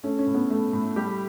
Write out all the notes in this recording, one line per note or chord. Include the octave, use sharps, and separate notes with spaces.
A3 C#4
C#4
A2
B3
A3
A2
G3 G4